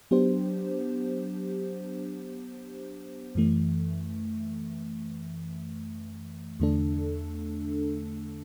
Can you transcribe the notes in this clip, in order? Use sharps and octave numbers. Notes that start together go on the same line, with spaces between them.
F#3 B3 D4 G4 C5
F#2 E3 A3
E2 D3 A3 D4 A4